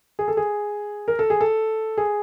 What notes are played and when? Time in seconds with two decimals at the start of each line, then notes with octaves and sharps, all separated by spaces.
0.19 G#4
0.28 A4
0.37 G#4
1.08 A#4
1.19 A4
1.30 G#4
1.41 A4
1.98 G#4